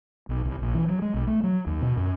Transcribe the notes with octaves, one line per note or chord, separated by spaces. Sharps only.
B1
C2
A#1
E3
F#3
G#3
B1
A3
F#3
D#2
B2
F#2